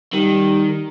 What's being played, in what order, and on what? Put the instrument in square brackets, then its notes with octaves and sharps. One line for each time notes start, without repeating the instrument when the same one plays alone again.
[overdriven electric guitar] D#3 [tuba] G3